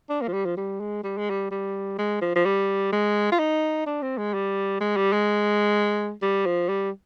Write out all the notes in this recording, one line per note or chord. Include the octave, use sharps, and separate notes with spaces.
D4
A#3
F3
G3
F3
G3
G#3
G3
G#3
G3
G3
G#3
F3
F3
G3
G#3
F4
D#4
D4
C4
G#3
G3
G#3
G3
G#3
G3
F3
G3